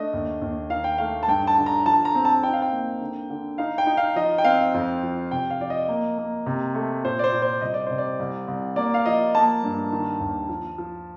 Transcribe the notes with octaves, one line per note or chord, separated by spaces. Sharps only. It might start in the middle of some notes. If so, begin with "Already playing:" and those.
Already playing: A3 D4 D#5
D#2
D#2
D#3 F5
G5
A3 F5
A5
G2 G5
A5
D3
A#5
F3 A5
A#5
C4
A5
D#4 G5
F5
G5
A#3
D3
D3
D#4 F5
G5
D#4
F5
F3 D#5
G5
C4 F5
F2
F3
C3 G5
F5
F3 D5
D#5
A#3
A#3
C3
A3
A#2 C5
D5
C5
A#2
C5
C2 D#5
D5
C3 C5
D5
C2
C2
A#3 D5
F5
F3 D#5
A#3 A5
G2
D#3
D#2
F3
F3